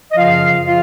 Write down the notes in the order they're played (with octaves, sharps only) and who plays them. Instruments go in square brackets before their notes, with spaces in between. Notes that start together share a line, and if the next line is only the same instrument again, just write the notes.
[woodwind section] D#5
F#2 C#3 F3 F4 F5
C#3 F3 F4 F5